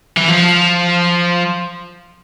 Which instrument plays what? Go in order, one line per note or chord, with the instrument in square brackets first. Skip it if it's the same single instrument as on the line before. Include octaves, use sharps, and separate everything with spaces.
[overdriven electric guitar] E3
F3